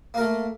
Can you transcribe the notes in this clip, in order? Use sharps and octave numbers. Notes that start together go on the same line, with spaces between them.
A3 A#3 A#4